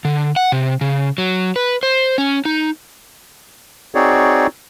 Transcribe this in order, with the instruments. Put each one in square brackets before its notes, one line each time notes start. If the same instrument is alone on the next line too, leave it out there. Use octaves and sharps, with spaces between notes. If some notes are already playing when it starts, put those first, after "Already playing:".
[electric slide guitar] D3
F#5
C3
C#3
F#3
B4
C5
C#4
D#4
[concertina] C4 D#4 F#4 G#4 C#5 D5